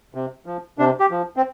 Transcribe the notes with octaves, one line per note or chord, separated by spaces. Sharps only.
C3
F3
C3 D4
G4
F3
C4